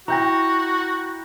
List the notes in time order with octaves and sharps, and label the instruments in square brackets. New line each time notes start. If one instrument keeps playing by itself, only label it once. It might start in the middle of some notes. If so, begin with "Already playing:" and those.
[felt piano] E4 G5 [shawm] F#4 [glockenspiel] A#5 G6 A#6